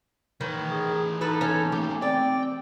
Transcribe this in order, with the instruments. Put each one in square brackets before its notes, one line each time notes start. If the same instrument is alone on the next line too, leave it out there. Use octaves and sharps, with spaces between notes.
[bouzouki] D#3 [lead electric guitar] E3 C#5
[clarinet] G#4
[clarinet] D#4 [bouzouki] A4 B4
[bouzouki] C#4 A4
[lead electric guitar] A3 A#3 [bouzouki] G4
[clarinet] C4 [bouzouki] D5 [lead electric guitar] G5